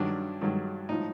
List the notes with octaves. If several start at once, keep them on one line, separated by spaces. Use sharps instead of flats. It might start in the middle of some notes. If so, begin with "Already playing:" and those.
Already playing: G2 D#3 F#3 D4
G2 D#3 F#3
A2 F3 D#4